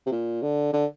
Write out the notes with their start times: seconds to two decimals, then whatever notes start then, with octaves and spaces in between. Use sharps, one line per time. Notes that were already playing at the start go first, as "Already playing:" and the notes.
0.06 C3
0.12 A#2
0.42 D3
0.73 D3